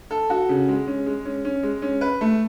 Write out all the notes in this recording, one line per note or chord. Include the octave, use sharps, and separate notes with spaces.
A4
F#4
C#3
G#3
C#4
G#3
C#4
C#4
G#3
C#4
B4
A3